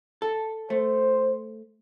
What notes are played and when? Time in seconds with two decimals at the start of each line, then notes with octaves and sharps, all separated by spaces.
0.22 A4
0.70 A3 C5